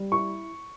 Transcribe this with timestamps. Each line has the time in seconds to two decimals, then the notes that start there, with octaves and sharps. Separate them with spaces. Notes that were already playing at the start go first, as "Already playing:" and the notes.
Already playing: G3
0.12 E4 C#6